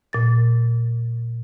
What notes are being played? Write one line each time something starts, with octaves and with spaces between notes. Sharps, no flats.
A#2 A6